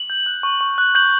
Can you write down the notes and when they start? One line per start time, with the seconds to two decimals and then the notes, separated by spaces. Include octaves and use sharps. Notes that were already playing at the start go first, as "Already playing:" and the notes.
Already playing: F#7
0.10 G6
0.26 F#6
0.43 C#6
0.61 C#6
0.78 F#6
0.95 G6 F#7